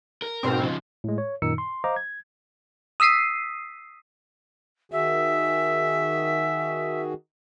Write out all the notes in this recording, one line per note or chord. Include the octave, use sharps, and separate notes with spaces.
A#4
G#2 B2 C4
C#3 F3
A2 G#3
C#5
F#2 A#2 D#3 D#4 E6 C#7
C6
C5 D#5 F5 A#5 D6
G#6
D#6 E6 B6 C7 D#7
D#3 F#4 G#4 E5